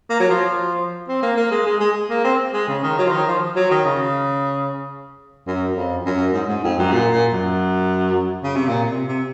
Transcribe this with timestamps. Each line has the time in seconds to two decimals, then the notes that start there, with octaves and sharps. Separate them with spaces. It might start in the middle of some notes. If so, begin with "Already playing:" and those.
0.10 A#3
0.20 F#3
0.30 F3
1.08 C4
1.22 A#3
1.37 A#3
1.51 G#3
1.66 G#3
1.80 G#3
2.10 A#3
2.24 C4
2.53 G#3
2.68 C#3
2.83 D#3
2.98 F#3
3.07 F3
3.12 D#3
3.27 F3
3.56 F#3
3.71 D#3
3.85 C#3
5.47 F#2
5.76 F2
6.06 F#2
6.34 G#2
6.49 G#2
6.64 F2
6.79 F#2
6.92 A#2
7.12 A#2
7.32 F#2
8.44 C#3
8.56 C3
8.68 A#2
8.89 C3
9.07 C3